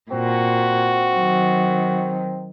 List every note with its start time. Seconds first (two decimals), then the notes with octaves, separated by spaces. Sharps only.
0.11 A#2 C4 F#4
1.13 D#3 F#3